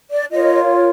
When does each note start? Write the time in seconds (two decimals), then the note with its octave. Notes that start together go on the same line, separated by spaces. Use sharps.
0.11 D5
0.30 F4 A#4 C#5 D#5